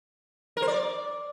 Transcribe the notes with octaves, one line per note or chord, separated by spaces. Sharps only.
A#4
C5
D5